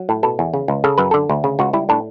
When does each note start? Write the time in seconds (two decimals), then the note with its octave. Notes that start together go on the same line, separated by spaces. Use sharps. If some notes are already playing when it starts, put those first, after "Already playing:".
Already playing: F#3
0.09 A2
0.23 B2 A4
0.39 E2
0.54 C#3
0.68 C#2
0.84 C#3 A4
0.98 F#2 B4
1.11 D3 A4
1.29 D2
1.44 C#3
1.59 C#2 F#4
1.73 G3 E4
1.89 A2 D4